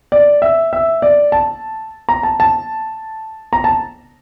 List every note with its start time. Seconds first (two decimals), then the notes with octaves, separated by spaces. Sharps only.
0.12 D5
0.42 E5
0.73 E5
1.02 D5
1.32 A5
2.09 A#5
2.23 A5
2.40 A5
3.53 A#5
3.64 A5